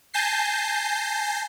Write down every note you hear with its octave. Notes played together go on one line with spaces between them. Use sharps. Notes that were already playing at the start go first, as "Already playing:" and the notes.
G#5 A5 G6 A#6 C7